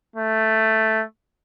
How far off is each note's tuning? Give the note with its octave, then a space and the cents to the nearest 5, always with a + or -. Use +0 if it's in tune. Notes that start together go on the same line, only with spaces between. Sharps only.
A3 +0